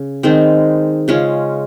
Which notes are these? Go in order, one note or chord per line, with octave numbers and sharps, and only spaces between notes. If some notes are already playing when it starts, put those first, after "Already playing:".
Already playing: C#3
D#3 G#3 C4
C#3 G#3 C#4 F4